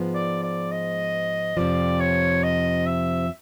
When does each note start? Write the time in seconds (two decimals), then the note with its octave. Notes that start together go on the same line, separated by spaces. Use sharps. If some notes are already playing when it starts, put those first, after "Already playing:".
Already playing: G#2 F3 G#3 B3
0.15 D5
0.43 D5
0.71 D#5
1.57 F2 C3 F3 D5
2.00 C#5
2.43 D#5
2.86 E5